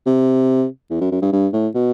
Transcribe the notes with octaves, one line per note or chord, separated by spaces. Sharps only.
C3
E2
F#2
F#2
G2
G2
A2
B2